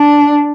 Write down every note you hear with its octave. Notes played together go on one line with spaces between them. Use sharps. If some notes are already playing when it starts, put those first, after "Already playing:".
Already playing: D4